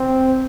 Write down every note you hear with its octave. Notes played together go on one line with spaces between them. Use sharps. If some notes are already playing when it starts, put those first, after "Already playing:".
Already playing: C4